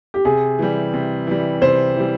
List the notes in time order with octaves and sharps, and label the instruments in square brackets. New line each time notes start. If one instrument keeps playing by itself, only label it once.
[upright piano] G4
[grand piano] C3 [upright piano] G#4
[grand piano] E3 G3
C3
E3 G3
[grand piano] C3 [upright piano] C5
[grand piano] E3 G3